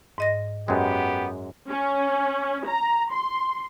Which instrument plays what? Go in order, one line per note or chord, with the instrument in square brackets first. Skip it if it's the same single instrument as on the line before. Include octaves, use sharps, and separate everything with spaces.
[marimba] G#2 D#5 A#6
[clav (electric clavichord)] F#2 G#3 [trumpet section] B3 G4
[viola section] C#4
A#5
C6